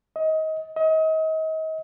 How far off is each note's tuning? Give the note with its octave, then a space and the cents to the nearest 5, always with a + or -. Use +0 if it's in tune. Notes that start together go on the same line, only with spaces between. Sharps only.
D#5 +25
D#5 +35